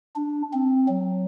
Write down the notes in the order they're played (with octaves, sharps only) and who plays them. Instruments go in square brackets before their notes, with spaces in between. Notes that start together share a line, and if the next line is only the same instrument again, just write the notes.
[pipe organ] D4
C4
F#3